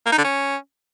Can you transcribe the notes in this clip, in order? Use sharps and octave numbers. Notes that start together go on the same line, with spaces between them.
A#3
D#4
D3
C#4